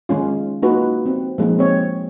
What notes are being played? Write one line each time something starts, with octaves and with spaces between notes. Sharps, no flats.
D#3 G#3 C#4 F4
A#3 D#4 F4 F#4 B4
C4
F3 G#3 A#3 D#4
C4 C#5